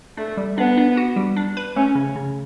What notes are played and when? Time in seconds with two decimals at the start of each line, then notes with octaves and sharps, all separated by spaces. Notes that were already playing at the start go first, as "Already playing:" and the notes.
0.17 A3 D4
0.37 G3
0.57 B3 D4
0.77 D4
0.97 F#4
1.16 G3
1.36 D4
1.57 B4
1.76 A3 C#4
1.95 C#3
2.16 C#3